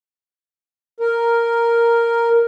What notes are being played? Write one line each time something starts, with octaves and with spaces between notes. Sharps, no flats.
A#4